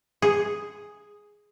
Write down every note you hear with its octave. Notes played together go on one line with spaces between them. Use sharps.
G#4